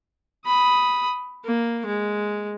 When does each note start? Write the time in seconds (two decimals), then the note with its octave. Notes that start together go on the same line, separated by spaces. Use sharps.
0.46 B5 D#6
1.44 A#3
1.86 G#3